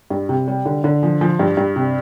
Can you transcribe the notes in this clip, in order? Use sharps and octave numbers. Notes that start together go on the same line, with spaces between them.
G2
C3
G3
D3
D3
F3
F3
G2
G2
C3